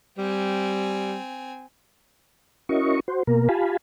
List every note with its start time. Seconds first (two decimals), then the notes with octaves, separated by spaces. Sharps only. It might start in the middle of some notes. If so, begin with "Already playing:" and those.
0.18 G3 C4 G#5
2.69 C#4 E4 F#4 A#4 D#5 C#6
3.08 F#4 C5
3.27 B2 A#3 A#4
3.49 F4 G4 F5 G#5 A5 B5